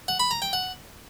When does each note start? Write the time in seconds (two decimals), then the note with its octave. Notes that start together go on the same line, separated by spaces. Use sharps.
0.08 F#5
0.20 B5
0.31 A#5
0.42 G5
0.53 F#5